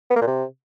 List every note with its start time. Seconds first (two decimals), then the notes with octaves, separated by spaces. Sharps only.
0.11 B3
0.16 A#3
0.22 A#2
0.27 C3